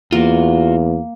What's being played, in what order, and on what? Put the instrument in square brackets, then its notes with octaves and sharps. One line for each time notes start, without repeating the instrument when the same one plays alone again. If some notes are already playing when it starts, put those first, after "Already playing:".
[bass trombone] E2 [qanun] A#3 [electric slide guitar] F4 F#4